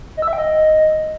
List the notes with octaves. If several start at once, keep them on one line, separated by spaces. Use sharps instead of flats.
D#5
E6
E5
G5
D#5